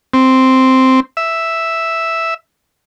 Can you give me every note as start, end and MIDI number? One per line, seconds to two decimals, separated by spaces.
0.14 1.00 60
1.17 2.34 76